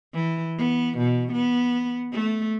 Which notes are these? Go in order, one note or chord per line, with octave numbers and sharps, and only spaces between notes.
E3
B3
B2
B3
A3